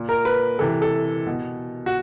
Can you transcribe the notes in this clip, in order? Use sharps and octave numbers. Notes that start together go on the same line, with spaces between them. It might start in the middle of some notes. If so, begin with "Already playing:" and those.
Already playing: A#2
A#4
B4
C3 E3 A4
A4
B2
F#4